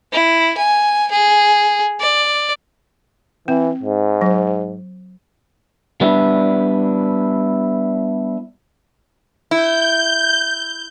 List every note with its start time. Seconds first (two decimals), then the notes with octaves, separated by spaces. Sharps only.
0.13 E4
0.58 G#5
1.12 G#4
2.00 D5
3.48 E3 C4
3.83 G#2
4.21 F#3
6.01 G3 B3 D4 E4
9.51 E4 G6